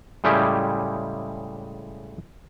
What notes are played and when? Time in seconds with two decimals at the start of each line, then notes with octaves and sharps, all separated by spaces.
0.24 A2 C#3 G3 G#3 E4 G4